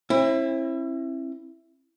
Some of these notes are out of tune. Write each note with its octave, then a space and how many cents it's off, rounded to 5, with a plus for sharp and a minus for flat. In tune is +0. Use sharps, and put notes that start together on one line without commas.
C4 +45 E4 +5